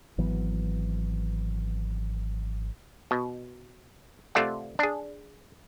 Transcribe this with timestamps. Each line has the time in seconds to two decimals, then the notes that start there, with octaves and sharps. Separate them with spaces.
0.18 G#1 E3 F#3 B3
3.11 B2
4.35 C3 A3 F4 D5 F#5
4.79 D4 G#4